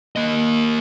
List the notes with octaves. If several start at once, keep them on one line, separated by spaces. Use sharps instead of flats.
A#3 D#5